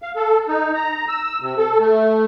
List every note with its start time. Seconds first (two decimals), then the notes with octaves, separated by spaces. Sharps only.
0.02 F5
0.16 A4
0.48 D#4
0.75 A#5
1.08 E6
1.41 C3
1.58 A4
1.79 A3